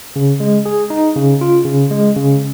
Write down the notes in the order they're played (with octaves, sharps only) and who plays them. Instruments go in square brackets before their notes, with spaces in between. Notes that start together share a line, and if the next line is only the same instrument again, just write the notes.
[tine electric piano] C#3
G#3
G#4
D#4
C#3
F4
C#3
G#3
C#3